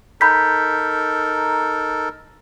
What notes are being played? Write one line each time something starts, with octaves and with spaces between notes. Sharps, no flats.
D#4 A4 A#4 B5 G6 B6